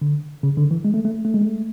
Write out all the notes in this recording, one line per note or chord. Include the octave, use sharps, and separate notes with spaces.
D3
C#3
D3
E3
G#3
A3
A3
A3
G#3
A3